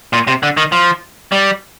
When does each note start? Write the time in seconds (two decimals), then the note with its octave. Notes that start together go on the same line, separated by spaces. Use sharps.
0.13 A#2
0.27 C3
0.43 D3
0.57 D#3
0.72 F3
1.32 G3